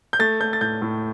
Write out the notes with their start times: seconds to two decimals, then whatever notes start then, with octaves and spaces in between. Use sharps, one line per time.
0.13 G6
0.19 A3 A6
0.41 A3 G6
0.53 A6
0.61 A2 G6
0.82 A2